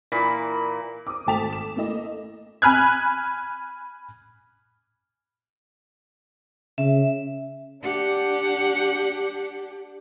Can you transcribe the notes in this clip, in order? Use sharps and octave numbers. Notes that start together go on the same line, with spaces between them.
A#2 E3 B5
D6 D#6
G#1 A3 A5 B6 F7
E7
A3 A#3 E4 D#5
G#5 B5 F6 F#6 G#6
C#3 E5
D4 G4 F#5